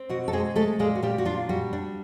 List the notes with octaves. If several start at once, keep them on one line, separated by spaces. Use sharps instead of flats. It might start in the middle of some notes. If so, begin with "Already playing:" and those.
Already playing: C4
B2 F#4
A4
G#3 C4 G#4
G#3 A3 A4
A#2 G#3 G#4
F#4
A#2 G3 G4
F#4
D4 F4
G3 F#4
D4